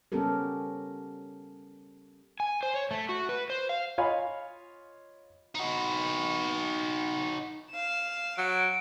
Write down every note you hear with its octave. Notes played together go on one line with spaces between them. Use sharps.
G3 B3 C#4 G4 A4 A#4
G#5
C5
C#5
A3
F#4
B4
C5
F5
F4 C#5 D#5 F5 G#5 B5
D#4 F#4
F5 E7
F#3 D7